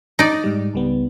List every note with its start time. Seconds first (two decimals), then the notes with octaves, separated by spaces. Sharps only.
0.19 D#4 D5
0.44 G#2 G3
0.74 C#2 G3 B3